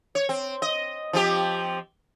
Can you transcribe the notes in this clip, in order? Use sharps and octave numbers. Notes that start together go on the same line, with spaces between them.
C#5
C4
D#5
F3 C4 G4